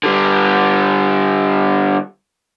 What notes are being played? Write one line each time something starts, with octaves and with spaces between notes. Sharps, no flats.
D3 G3